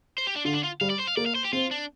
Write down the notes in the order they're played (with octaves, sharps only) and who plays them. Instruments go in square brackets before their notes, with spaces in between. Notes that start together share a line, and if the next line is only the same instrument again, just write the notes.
[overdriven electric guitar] C5
G4
D4
[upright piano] D3 [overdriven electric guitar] F4
[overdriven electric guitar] D4
F4
[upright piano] G3 [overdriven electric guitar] F5
[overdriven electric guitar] D5
C5
F5
[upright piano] A#3 [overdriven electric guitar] D5
[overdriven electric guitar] F5
C5
G4
[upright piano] C4 [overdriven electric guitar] F4
[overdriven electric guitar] D4